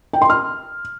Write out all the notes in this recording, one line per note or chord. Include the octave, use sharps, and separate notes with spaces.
G5
C6
F6